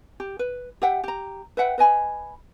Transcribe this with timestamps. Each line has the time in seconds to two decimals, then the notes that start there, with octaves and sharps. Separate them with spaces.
0.20 G4
0.39 B4
0.82 G4 E5 F#5 G5
1.04 G4 A#5
1.57 B4 E5 F#5 G5
1.78 B4 D#5 G#5 B5